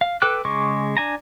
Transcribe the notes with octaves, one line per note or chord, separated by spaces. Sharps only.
F5
A4 B4 G5 D6 F#6
C#3 G#3 C#6 D6
D4 G#5 A#5